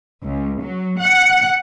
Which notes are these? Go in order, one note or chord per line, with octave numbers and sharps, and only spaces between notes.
C#2
F#3
F#5